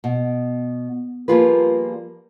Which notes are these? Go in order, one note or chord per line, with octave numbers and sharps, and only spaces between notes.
B2
F3 G3 A#3 F4 G#4 B4